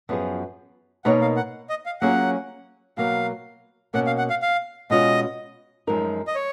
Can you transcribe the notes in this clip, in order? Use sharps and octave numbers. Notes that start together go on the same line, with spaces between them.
F#2 F3 B3 F4 G#4
B2 A#3 D#4 A#4 C#5 F#5
F5
F#5
D#5
F5
F#3 A#3 C#4 F4 G#4 F#5
B2 F#3 A#3 F5
B2 A#3 C#4 F#5
F5
F#5
F5
F5
B2 G#3 C#4 F4 D#5
F#2 F3 G#3 D#4 A#4
D#5
C#5